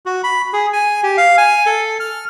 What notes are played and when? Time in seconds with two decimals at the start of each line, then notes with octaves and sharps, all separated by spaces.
0.06 F#4
0.24 B5
0.53 G#4
0.73 G#5
1.03 G4
1.17 F5
1.38 G#5
1.66 A4
2.00 F6